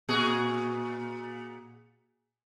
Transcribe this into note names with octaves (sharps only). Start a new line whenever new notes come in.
A#2 F#4 G#4